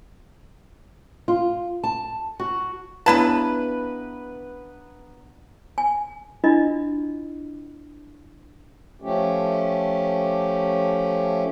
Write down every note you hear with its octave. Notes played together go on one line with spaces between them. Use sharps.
F4
A5
F#4
C#3 B3 D4 E4 B4 A5 A#5
G#5
D4 E4 F4 D#5
F3 A3 C#4 G4